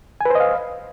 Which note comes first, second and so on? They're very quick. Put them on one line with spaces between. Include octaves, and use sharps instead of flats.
G#5 B4 C5 D#5 F5